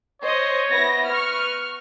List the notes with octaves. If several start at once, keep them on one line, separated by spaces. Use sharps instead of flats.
C5 C#5 D#5
B3 E4 A#6
B4 C#6 F6